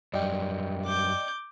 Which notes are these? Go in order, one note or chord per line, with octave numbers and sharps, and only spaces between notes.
F#2 G3 D5 D#5 G5
D6 G6